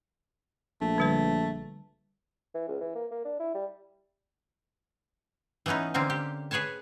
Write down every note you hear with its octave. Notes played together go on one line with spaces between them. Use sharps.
A#1 A3
D3 G3 B4
E3
C#2
E3
A#3
A#3
D4
E4
G3
E3 A3 B3 C#4 D#4
D3 A#3 C4 C#4
G4
G#4 B4 C#5 G#5 A5